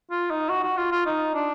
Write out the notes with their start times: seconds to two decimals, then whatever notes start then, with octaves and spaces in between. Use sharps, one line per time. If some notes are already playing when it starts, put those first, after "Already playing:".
0.11 F4
0.30 D#4
0.49 F#4
0.63 F#4
0.77 F4
0.92 F4
1.06 D#4
1.34 D4